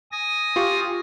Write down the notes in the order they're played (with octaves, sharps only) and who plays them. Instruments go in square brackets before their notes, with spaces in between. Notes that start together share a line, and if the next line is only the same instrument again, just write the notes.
[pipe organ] G#5 D#6 A#6
[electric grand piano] F4 G4 C#6